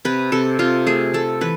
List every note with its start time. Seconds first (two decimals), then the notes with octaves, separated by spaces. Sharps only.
0.05 C3 B4
0.32 C3 A4
0.59 C3 F4
0.87 A3 G#4
1.14 A3 A4
1.41 E3 B4